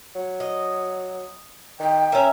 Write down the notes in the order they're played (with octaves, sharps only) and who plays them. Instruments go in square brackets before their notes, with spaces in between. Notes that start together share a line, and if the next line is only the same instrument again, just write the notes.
[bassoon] F#3
[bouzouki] D#5
[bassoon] D#3 [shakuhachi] G5
[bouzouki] C#4 E5 [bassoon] A#4